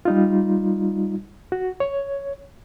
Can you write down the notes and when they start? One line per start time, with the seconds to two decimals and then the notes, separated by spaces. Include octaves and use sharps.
0.05 G3 D#4 F4
1.52 F#4
1.80 C#5